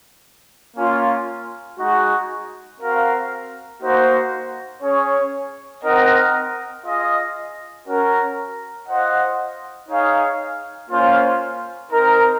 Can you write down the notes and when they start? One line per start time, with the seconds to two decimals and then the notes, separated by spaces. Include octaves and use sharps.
0.77 A#3 C#4 F4
1.79 G#3 D#4 F#4
2.80 C4 F#4 A#4 F5
3.81 A#3 D#4 F#4 C5
4.82 C#4 G#4 C#5
5.83 C4 D#4 A#4 D#5 F#5
6.85 F4 G#4 D#5
7.86 C#4 F#4 A#4
8.87 F4 C5 D#5 F#5
9.89 D#4 G#4 C#5 F5
10.90 A#3 C#4 F4 C5 F5
11.91 C4 D#4 A#4